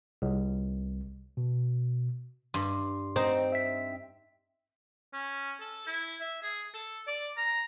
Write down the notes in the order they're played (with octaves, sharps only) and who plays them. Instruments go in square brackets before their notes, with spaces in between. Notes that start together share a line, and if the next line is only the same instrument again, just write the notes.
[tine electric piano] C2
B2
[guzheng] G2 [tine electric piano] C6
[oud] C4 [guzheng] D#4
[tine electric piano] E5 B6
[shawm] C#4
A4
E4
E5
G#4
A4
D5
A#5